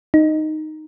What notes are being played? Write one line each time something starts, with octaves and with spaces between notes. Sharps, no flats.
D#4